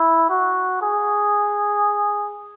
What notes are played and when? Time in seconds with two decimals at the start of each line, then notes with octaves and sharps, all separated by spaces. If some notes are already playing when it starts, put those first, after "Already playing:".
Already playing: E4
0.30 F#4
0.82 G#4